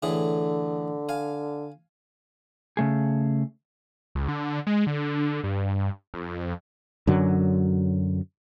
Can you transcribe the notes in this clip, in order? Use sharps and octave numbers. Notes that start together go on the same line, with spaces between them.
A2 D3 E3 G#4
F5 G#5
C#3 A3 G#4
C#2
D3
G#3
D3
G2
F2
F#2 D3 F#3